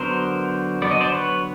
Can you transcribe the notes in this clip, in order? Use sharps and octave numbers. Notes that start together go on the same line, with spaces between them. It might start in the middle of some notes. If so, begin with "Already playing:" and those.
Already playing: D3 F#3 B3 A#4 C5
D3 F#3 B3 D5
D#5
C5 D5
B4 C#5